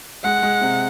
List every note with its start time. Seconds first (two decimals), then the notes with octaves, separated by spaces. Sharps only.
0.24 G#3 F#5
0.43 G#3
0.61 C3